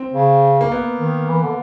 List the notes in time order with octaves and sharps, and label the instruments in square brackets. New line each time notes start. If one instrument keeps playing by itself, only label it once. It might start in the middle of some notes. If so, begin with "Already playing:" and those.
Already playing: [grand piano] C4
[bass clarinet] C#3
[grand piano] A#3
B3
[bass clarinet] D#3
E3
D3